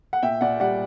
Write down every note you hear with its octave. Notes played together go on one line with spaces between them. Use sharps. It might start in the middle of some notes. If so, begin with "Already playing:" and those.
F#5
A#2 E5 G5
A#2 D5 F#5
G3 D5 F#5